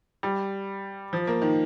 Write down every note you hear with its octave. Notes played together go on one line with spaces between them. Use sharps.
G3
F3
A#3
D#3